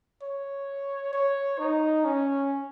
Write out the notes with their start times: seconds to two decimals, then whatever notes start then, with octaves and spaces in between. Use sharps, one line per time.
0.23 C#5
1.13 C#5
1.59 D#4
2.05 C#4